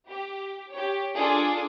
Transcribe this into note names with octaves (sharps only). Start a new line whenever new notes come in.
G4
G4 C#5
D4 F4 G#4 A4 D5